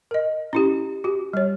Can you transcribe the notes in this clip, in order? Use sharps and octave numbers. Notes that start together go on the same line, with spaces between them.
A#4 D#5
C#4 E4 G4
F#4 G4
G3 C#5